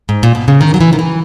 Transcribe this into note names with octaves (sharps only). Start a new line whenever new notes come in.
G#2
A#2
B2
C#3
D#3
F#3
E3
D#3
E3